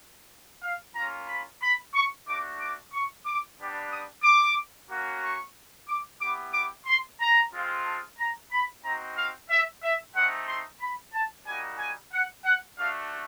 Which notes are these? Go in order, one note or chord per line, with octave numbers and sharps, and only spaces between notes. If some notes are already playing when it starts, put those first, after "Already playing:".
F5
A#3 C#4 F4 A#5
B5
B5
C#6
A3 D4 F#4 D6
D6
C#6
D6
G3 B3 D4 G4
D#6
D6
A#3 C#4 F#4
C#6
D6
B3 E4 G4 D6
D6
C6
A#5
G#3 C4 F4
A5
A#5
B5
C4 D#4 F#4 A#5
F5
E5
E5
A3 C4 D#4 F#5
C6
B5
A5
G3 A#3 D#4 F#4 G#5
G#5
F#5
F#5
A3 D4 F#4 F5